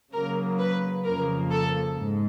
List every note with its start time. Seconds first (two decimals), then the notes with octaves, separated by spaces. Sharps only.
0.12 C#3 F#3 A#3 A#4
0.59 B4
1.05 F2 C#3 F3 A#3 A#4
1.52 A4
1.98 G#2